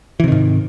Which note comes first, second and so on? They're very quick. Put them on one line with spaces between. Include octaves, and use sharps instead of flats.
E3 C3 D#3 G#2